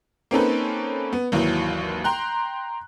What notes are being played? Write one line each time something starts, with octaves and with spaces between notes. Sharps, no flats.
A#3 C4 C#4 D#4 A4 B4
B3
G#1 D#2 E3 F#3
G5 A#5 C6 F#6